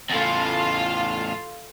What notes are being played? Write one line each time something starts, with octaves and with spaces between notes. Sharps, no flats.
E2 A2 F4 A4 F5